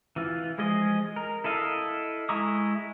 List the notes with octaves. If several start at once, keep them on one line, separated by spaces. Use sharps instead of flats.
E3 F4
F3 G#3 G#4 D#5
A#4
E4 A4 D#5 F5
G#3 E4 A#5 C#6 D#6